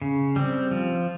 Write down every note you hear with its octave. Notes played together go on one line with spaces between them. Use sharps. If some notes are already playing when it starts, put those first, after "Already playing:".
C#3
G3 C4
F3